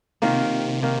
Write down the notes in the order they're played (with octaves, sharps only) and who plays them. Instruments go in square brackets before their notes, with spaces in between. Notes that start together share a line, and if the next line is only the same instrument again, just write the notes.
[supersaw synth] C3 [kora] D#3 A#3 F4
[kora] D#3 A#3